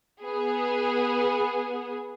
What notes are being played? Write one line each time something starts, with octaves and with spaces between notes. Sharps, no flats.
B3 G#4